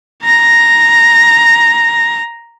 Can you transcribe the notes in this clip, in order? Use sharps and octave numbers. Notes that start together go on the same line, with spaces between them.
A#5 A#6